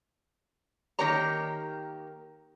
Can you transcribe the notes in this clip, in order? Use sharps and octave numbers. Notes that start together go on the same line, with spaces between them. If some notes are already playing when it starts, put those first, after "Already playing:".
D#3 A#3 G4 A#4 C#5 A#5